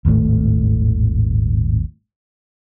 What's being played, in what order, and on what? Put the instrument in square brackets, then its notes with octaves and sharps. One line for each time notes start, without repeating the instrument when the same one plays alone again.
[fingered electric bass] D#1 G#1 A2 A3